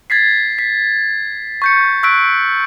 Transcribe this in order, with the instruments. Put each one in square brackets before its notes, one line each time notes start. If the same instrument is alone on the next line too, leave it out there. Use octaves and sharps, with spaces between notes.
[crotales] G#6 A6 B6 C7
B6
C#6 G6 C#7
C#6 E6 F#6 B6 D7